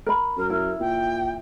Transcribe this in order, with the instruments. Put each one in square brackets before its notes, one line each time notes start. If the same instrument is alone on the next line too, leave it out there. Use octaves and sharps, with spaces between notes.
[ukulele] A#4 B5
[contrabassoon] F#2 [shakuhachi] A#4
[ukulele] E4 [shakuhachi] A#4
[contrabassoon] A#2 [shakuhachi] G5